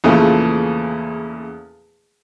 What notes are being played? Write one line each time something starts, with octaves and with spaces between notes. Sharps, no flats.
E2 A#2 C#3 F3 A3